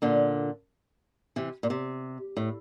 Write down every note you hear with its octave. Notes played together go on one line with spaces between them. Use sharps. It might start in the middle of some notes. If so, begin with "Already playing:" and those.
A#2 D3
C3 E3
A#2
C3
A2